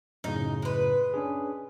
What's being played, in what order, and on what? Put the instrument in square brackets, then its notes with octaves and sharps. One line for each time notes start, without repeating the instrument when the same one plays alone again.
[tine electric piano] F#2 A2 C#3 [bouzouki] D#4
[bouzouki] G#3 B4
[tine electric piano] C#4 D4 G#4